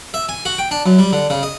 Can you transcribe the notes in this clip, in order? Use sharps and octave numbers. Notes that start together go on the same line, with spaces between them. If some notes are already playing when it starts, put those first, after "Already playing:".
E5
G#5
F#4
G5
D4
F#2
G3
D3
C#3
D#5